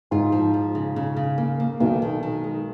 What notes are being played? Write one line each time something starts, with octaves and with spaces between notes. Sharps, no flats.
G#2 F4
F3
F3
C#3
C#3
C#3
A#3
A#3
B1 B2 D#3
D#3
D#3
G#3